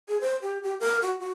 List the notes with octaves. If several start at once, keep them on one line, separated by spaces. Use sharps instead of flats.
G#4
C5
G4
G4
A#4
F#4
F#4